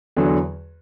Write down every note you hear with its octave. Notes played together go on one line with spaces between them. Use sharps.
E2 D3 F#3